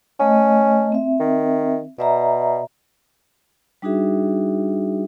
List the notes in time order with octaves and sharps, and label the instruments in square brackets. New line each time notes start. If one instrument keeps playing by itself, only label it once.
[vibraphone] A3 D#5 [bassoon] C#4
[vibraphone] C4 E5
[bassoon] D#3
[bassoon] B2 [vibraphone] D5 E5 A#5
[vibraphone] G3 D4 D#4 F#4 G#4 E5